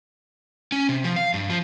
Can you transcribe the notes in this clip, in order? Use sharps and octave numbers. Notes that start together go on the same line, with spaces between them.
C#4
C3
F3
F5
G2
F3